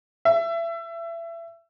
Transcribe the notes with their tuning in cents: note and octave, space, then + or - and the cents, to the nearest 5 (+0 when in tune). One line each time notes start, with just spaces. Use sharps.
E5 +30